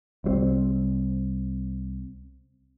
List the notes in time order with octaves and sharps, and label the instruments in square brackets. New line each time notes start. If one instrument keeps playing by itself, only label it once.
[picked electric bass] C2 F#3 C4